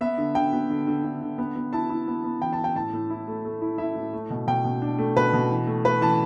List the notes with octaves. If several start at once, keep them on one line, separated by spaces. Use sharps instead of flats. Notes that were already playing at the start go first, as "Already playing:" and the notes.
B3 E5
D3
D3 G5
B3
D3
D3
D3
D3
B3
B3
E4 A5
E4
B3
B3
E3 G5
A5
E4
G5
A2 A5
A2
E4
A3
A3
E4
E4 E5
A2
A3
B2
B2 G5
B2
D4
A3
B2 B4
B2
E3
A3
A3 B4
E3 A5